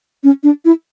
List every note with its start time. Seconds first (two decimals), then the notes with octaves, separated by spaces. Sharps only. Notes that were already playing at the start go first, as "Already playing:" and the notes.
0.24 C#4
0.43 D4
0.65 E4